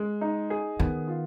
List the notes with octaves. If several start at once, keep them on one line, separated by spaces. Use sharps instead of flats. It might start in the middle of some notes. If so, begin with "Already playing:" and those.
Already playing: G#3
D#4
G#4
D#3 B3
F4